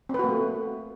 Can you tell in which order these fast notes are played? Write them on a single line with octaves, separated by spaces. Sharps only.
C4 B4 F#4 A#3 A3